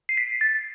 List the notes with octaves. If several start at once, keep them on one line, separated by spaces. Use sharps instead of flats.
C7
B6
A6